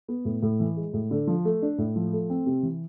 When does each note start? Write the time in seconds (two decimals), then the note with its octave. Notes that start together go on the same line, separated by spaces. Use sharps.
0.08 B3
0.25 A2
0.42 A2
0.60 E3
0.77 G#3
0.93 A2
1.11 D3
1.27 F3
1.45 A3
1.62 D4
1.78 A2
1.96 F3
2.13 A3
2.30 C4
2.46 C3
2.63 E3